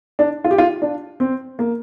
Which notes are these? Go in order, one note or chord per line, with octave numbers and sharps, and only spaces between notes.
D4
F4
G4
F4
D4
C4
A#3